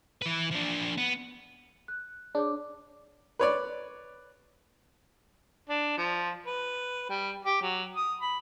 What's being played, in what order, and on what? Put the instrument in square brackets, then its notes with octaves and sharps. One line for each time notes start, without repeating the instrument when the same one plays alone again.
[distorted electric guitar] E3 B4
F3 D4
B3
[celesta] F#6
[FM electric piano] D4 [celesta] G#4 C#5 D6
[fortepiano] B4 C#5 D5
[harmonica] D4
F3
B4
G3
G4
F#3
D#6
B5